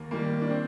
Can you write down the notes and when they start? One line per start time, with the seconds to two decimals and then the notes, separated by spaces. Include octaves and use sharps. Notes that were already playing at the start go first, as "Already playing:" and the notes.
Already playing: D#2 A#3
0.11 D#3 G3 A#3
0.42 D4
0.49 C4